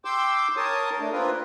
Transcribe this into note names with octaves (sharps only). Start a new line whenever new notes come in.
G5 C6 D6 E6
A#4 C#5 A5 D#6
A3 D4
A#3 C4 F4 A#4 B4